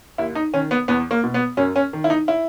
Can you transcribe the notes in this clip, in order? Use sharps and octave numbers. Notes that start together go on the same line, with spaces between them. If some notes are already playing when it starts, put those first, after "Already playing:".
D#2 E4
D#4
D#3 C#4
B3
E2 B3
A#3
B2
B3
F#2 C#4
C#4
D#3
E4
D#4
E4